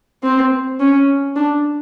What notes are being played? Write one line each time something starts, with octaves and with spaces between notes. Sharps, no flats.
C4
C#4
D4